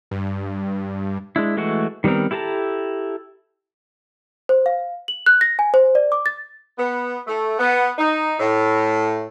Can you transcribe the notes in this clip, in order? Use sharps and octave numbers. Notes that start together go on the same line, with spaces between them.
G2
G#3 D4 E4
E3 G#3 A3 F#4
D#3 G3 B3 C4 A#4
E4 G4 A4 A5 A#5
C5
F5
F#7
F#6
A#6
G#5
C5
D5
D6
A6
B3
A3
B3
D#4
A2